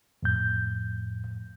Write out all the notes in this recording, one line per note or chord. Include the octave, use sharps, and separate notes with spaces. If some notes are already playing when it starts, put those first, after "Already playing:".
F2 A2 G6